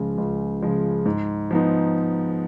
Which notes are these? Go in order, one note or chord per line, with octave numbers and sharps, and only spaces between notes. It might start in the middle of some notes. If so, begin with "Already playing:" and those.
Already playing: C#2 C#3 F3 G#3
C#2
C#3 F3 G#3
G#2
F3 B3 D#4